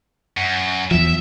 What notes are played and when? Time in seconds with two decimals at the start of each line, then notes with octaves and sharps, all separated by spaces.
0.37 F#2
0.91 E2 F3 E5